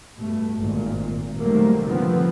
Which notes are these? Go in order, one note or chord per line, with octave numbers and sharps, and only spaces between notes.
G2 B2 A3
G#1 A#2
C3 D#3 F#3 G3 A3 A#3
D3 F3 B3 C4